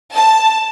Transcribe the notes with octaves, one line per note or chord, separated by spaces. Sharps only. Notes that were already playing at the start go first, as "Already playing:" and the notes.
A5